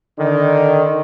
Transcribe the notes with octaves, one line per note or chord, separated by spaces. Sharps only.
D3 D#3